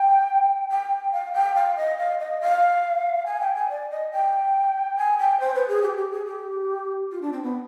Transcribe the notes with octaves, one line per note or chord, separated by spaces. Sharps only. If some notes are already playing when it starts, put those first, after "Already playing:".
Already playing: G5
G5
F5
G5
F5
D#5
F5
D#5
F5
G#5
G5
G#5
D5
D#5
G5
G#5
G5
C5
B4
G#4
G4
G4
G#4
G4
F4
D4
C4
B3